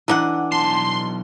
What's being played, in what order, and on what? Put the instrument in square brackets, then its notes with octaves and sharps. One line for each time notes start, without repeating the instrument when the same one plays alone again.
[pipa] D3 D#4 F#5 [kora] E3 D4
[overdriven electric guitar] B1 A5 [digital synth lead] C6